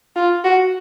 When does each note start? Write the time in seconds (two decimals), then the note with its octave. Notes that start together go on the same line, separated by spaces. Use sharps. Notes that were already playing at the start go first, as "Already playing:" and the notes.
0.16 F4
0.44 F#4